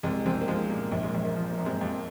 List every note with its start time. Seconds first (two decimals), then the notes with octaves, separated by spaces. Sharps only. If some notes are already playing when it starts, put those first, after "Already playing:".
0.03 C2 G#3
0.26 C2 G#3 C4
0.41 A#3
0.48 F3 G#3
0.70 A#2 A#3
0.92 A#1 A#3
1.04 G#3
1.14 A#1 A#3
1.25 A#3
1.36 F3
1.51 A#3
1.58 A#2
1.65 G#3 C4
1.81 F2 A#3